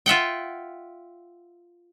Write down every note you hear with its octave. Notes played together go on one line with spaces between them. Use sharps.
F4 E5 F#5 G5